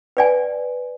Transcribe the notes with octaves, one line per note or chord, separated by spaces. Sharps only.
B4 D5 G#5